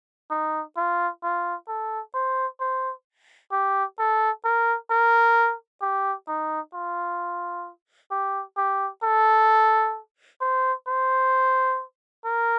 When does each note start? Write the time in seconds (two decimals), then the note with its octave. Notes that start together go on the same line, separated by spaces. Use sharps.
0.31 D#4
0.77 F4
1.23 F4
1.68 A4
2.15 C5
2.60 C5
3.52 G4
3.99 A4
4.45 A#4
4.91 A#4
5.82 G4
6.28 D#4
6.74 F4
8.11 G4
8.57 G4
9.03 A4
10.41 C5
10.87 C5
12.25 A#4